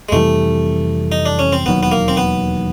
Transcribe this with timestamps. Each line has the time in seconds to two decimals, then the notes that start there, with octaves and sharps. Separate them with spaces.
0.09 G#3
0.12 F2 C3 E3 G3 A3
1.12 D#4
1.26 D4
1.39 C#4
1.53 C4
1.66 E1 D#2 D#3 F#3 B3
1.83 B3
1.92 A#3
2.08 C4
2.17 B3